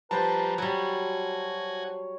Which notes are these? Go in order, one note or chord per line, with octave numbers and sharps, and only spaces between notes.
F3 G3 B4 C5 A5 A#5
F#3 G3 F#4 C#5 G#5